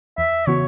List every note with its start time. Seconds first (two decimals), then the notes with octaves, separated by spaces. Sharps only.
0.18 E2 E5
0.47 C#3 E3 B3 F#4 C#5